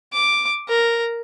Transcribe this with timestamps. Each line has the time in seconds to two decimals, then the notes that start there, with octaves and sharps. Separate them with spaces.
0.13 D6
0.69 A#4